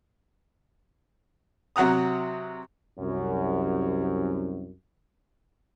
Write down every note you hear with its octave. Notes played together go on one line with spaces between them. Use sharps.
C3 F#3 F#5 A#5 D#6
C2 F#2